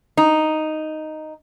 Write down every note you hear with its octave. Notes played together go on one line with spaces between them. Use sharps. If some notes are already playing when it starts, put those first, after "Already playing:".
D#4